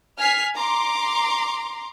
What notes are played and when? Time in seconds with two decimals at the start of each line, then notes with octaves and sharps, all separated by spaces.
0.17 G#5 F6 B6 C7
0.55 A#5 C6 D6